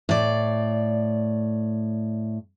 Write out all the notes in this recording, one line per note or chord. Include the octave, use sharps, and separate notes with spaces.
A2 D5